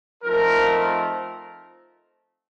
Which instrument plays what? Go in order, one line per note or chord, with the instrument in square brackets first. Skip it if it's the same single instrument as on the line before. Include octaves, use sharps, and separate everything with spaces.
[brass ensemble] F3 A3 C4 D#4 A#4